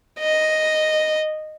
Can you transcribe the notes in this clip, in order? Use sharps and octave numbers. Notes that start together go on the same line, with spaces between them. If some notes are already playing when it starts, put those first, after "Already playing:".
D#5